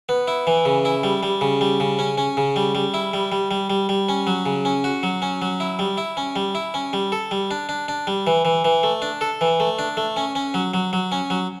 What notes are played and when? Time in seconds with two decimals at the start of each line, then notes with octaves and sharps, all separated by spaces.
0.09 B3
0.28 E4
0.47 E3
0.65 C#3
0.85 E4
1.04 G3
1.23 G3
1.41 C#3
1.61 G3
1.80 C#3
1.99 C#4
2.18 C#4
2.37 C#3
2.56 G3
2.75 G3
2.94 E4
3.14 G3
3.32 G3
3.51 G3
3.70 G3
3.89 G3
4.09 C#4
4.27 F#3
4.46 C#3
4.65 C#4
4.84 F#4
5.03 F#3
5.22 C#4
5.42 F#3
5.60 E4
5.79 G3
5.98 E4
6.17 C#4
6.36 G3
6.55 E4
6.74 C#4
6.93 G3
7.12 A4
7.31 G3
7.51 D4
7.69 D4
7.88 D4
8.07 G3
8.27 E3
8.45 E3
8.65 E3
8.83 A3
9.02 D4
9.21 A4
9.41 E3
9.60 A3
9.79 D4
9.97 A3
10.17 C#4
10.35 C#4
10.54 F#3
10.74 F#3
10.93 F#3
11.12 C#4
11.30 F#3